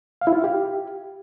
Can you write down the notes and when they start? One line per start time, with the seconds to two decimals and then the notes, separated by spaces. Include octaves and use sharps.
0.21 F5
0.27 E4
0.33 F4
0.38 F5
0.44 G4